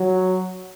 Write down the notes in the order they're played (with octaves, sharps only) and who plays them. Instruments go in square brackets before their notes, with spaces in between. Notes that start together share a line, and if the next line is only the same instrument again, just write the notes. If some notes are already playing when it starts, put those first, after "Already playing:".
Already playing: [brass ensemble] F#3